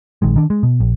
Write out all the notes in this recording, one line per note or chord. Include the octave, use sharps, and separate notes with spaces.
A#1 D#3 G#3
D#3 D4
G#3
B2
A#1